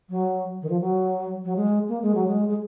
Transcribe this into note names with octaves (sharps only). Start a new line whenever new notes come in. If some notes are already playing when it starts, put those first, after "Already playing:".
F#3
D#3
F3
F#3
F#3
G#3
A#3
G#3
F#3
G#3
G#3